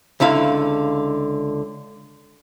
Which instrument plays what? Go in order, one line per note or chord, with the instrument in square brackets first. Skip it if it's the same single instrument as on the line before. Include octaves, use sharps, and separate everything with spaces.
[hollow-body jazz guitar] C#2 D3 E4 F5